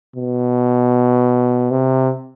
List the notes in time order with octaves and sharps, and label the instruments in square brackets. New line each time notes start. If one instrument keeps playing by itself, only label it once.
[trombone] B2
C3